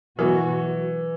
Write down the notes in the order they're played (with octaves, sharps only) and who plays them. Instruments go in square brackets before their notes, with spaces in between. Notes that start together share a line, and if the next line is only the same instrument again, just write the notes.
[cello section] B2 F#3 B3 F#4 [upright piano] E3